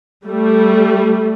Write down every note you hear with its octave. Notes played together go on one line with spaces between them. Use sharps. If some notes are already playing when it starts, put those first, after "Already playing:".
G3 A3